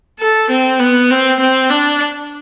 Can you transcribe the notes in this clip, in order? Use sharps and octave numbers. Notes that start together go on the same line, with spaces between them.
A4
C4
B3
C4
C4
D4